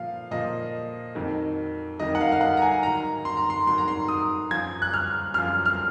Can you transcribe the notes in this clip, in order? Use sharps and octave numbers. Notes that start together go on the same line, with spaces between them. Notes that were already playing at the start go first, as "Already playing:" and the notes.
Already playing: A#2 F3 F5
A#2 F3 D#5
F2 D#3 F#3
F2 D#3 F#3 D#5
F#5
F5
F5
F#5
A#5
G#5
G#2 D#3 F#3 A#5
C6
A#5
C6
G#2 D#3 F#3 C6
A#5
C6
D#6
F#2 F3 G#6
F#6
F6
F#2 F3 F6
F6